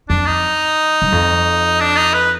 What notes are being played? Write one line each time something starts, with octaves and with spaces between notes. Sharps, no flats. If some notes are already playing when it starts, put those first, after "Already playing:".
F2 D4
D#4
G2
F2
D4
D#4
B4